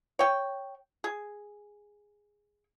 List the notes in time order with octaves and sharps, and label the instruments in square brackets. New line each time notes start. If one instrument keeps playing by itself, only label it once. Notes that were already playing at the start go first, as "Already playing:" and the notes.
[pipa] C#5 G5
G#4